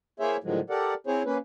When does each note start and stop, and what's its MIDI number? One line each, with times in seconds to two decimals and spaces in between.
0.20 0.37 58
0.20 0.37 64
0.20 0.37 68
0.20 0.37 72
0.20 0.37 73
0.20 0.37 76
0.44 0.60 45
0.44 0.60 50
0.44 0.60 51
0.44 0.60 53
0.44 0.60 54
0.44 0.60 56
0.70 0.94 67
0.70 0.94 69
0.70 0.94 70
0.70 0.94 74
0.70 0.94 78
1.07 1.23 60
1.07 1.23 64
1.07 1.23 68
1.07 1.23 72
1.07 1.23 73
1.25 1.38 58
1.25 1.38 61
1.25 1.38 71